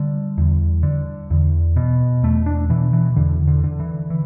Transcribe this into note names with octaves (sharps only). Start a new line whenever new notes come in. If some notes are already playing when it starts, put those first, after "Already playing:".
Already playing: D3 G3
E2
D3
E2
B2
E2 A3
D4
B2 E3
E3
E2 D3
D3
D3
E3
E3